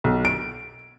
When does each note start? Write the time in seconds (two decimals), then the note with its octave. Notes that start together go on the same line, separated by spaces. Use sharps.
0.04 B1
0.25 D7